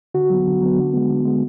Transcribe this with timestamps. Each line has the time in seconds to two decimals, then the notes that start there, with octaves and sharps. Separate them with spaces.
0.14 D3 F#4
0.30 F#3 B3
0.47 D3
0.62 F#3 B3
0.78 D3
0.93 G#3 B3
1.10 D3
1.25 G#3 B3